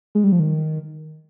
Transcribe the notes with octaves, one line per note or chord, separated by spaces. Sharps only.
G#3
G3
F3
D#3